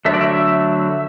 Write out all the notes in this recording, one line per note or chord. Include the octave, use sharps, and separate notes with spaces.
D3 F#3 A3 E5
D5
E5